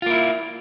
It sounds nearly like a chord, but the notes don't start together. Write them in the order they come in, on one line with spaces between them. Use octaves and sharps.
F4 A#3 E4